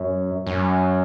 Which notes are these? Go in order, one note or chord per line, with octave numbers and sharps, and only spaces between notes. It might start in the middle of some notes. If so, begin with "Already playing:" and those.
Already playing: F#2
F#2